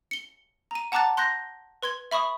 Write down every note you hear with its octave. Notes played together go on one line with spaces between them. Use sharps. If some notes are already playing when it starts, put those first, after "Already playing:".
C#7 G7
A#5 D#7
F#5 A5 A#5 D6 F#6 A6
C6 F#6 G6 A#6
B4 C6 G#6 G7
E5 B5 C#6 D#6